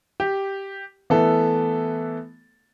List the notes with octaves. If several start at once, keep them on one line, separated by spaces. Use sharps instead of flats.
G4
E3 A3 B3 A4